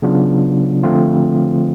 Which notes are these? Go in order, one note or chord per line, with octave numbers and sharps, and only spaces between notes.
C#3 F#3 B3 D4 F4
D3 F3 A3 C4 F4